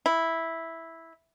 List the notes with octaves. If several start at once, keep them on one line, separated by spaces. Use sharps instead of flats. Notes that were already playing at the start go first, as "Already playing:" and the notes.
E4